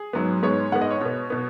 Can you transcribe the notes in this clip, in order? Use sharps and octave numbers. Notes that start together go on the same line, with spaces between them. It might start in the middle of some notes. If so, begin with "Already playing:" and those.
Already playing: G#4
G#2 F#3 B3
G#2 G#3 B3 C#5
G#2 G#3 B3 F#5
D#5
C#5
B2 B3
B2 B3